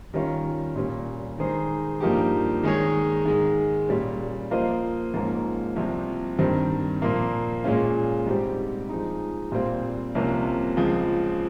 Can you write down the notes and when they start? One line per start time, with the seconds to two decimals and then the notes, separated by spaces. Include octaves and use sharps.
0.14 D#3 G3 C#4 F4
0.75 A#2 G3 C#4
1.38 D#3 G#3 D#4 G#4 C5
2.01 G2 F3 A#3 D#4 G4
2.63 D#3 G#3 D#4 G#4 C#5
3.25 G#2 D#3 G#3
3.89 A#2 G3 C#4
4.51 F3 A#3 F4 C5 D#5
5.14 G#2 F3 A#3 C#4
5.76 C2 C3 F3
6.38 G2 D#3 G3 C4
7.02 A#2 F3 A#3
7.64 A#2 G#3 C#4 F4
8.27 G#2 G3 C4 G4
8.89 F3 G#3 D#4
9.52 A#2 G3 C4 F4
10.15 C2 C3 F3 A#3 C#4
10.77 C#2 C#3 F3